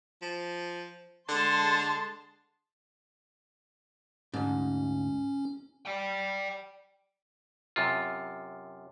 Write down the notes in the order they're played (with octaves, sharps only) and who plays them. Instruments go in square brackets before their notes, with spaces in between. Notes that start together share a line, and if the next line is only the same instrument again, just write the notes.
[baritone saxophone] F3
[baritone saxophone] D3 [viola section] G#3 A5 C6
[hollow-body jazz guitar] D2 G#2 [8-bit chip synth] C#4
[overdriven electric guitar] D5 G5
[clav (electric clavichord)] F#2 C3 F4